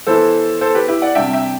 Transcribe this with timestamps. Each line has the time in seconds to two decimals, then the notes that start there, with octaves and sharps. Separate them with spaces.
0.07 E3 B3 E4 A4 C5
0.61 A4 C5
0.75 G4 B4
0.88 E4 G4
1.02 D5 F#5
1.15 C3 G3 D4 E5 G5
1.33 E5 G5